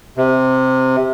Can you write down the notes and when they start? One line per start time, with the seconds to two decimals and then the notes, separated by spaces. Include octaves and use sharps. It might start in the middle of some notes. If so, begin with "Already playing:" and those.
0.17 C3